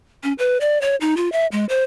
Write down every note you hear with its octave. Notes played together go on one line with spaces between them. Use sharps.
C#4
B4
D5
C#5
D#4
F4
E5
G#3
C5